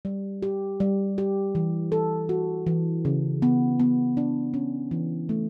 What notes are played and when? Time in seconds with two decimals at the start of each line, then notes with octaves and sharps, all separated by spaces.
0.05 G3
0.42 G4
0.80 G3
1.18 G4
1.55 E3
1.92 A4
2.29 F#4
2.67 E3
3.05 C#3
3.42 B3
3.80 B3
4.17 D4
4.54 C#4
4.91 E3
5.29 A3